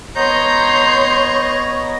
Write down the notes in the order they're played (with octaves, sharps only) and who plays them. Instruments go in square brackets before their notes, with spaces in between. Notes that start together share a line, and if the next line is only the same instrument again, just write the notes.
[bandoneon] B3 D#5 [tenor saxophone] C#5 [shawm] A#5 [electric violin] C6 G6